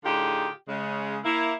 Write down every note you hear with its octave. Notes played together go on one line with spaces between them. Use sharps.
A2 D3 D#4 F4 G4 G#4
C#3 G#3
A#3 E4